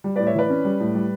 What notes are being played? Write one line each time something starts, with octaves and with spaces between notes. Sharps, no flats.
G3
A2 B4 D5
C#5 E5
E3 B4 D5
C#4
G3
A2
G3